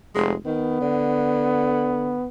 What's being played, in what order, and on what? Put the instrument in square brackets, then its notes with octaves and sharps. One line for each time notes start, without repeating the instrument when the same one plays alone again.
[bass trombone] F1 [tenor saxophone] G#3
[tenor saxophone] D#3 [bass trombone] B3
[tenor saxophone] D3